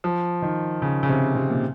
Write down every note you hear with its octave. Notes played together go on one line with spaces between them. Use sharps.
F3
D#3
C#3
C#3
C3
C3
A#2